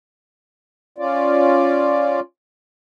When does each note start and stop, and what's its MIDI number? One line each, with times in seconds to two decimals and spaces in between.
0.98 2.20 61
0.98 2.20 65
0.98 2.20 74